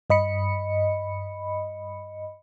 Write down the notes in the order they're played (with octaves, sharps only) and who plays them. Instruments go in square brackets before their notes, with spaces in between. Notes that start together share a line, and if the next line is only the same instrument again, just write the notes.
[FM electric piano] G2 D#5 B5 C#7